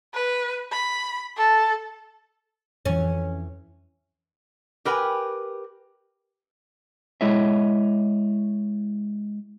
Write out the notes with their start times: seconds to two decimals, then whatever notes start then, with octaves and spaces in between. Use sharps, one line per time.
0.14 B4
0.72 B5
1.37 A4
2.85 F2 E3 C#4
4.85 G4 A#4 B4 G5 G#5
7.21 G#3 E4 C#5 D#5 E5